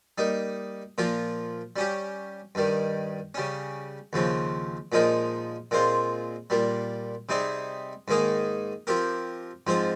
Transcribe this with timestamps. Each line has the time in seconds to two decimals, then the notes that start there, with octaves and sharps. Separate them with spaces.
0.18 G3 A#3 D#4
0.98 A#2 F3 A#3 F4
1.76 G3 C#4 G4
2.55 G2 D#3 G3
3.35 C#3 G3 C#4
4.13 D#2 C#3 F3 C4
4.92 A#2 F3 G#3 D#4 A#4
5.71 A#2 G#3 C4 F4 C5
6.50 A#2 G3 A#3
7.29 C3 G3 C4 D#4 G#4
8.08 G#2 D#3 A#3 D#4 G#4
8.87 F3 C4 G4 A#4
9.67 G#2 F3 C4 F4 C5